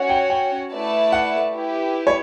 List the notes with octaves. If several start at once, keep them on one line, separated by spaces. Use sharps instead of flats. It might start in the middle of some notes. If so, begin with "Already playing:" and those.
Already playing: C#4 F#4 C#5 F#5
G5
G5
A3 E4 B4 D5 A5
F#5
E4 G4 B4
C#5